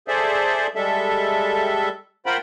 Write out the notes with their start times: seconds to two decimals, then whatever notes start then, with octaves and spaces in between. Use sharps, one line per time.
0.08 G#4 A4 C5 D5 E5
0.75 G3 G#3 A4 E5
2.26 F4 A#4 C5 F#5 G5 B5